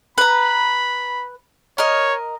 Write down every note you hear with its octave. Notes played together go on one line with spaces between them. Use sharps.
B4 A#5 B5
A#4 C#5 D#5